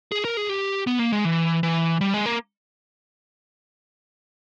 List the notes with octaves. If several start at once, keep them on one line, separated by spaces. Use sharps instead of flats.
G#4
A#4
G#4
G4
B3
A#3
G#3
E3
E3
G3
G#3
A#3